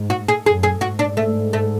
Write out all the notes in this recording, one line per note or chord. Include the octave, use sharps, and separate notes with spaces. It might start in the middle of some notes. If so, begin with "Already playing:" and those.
Already playing: G#2
F#4
G#4
F#2 G#4
G#4
G#2 F#4
D4
A3
A3